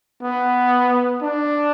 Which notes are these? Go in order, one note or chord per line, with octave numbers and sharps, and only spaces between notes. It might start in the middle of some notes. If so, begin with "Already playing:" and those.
B3
D4